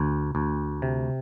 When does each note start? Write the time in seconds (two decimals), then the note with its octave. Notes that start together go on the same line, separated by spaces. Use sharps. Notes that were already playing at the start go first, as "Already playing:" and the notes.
Already playing: D2
0.35 D2
0.82 C3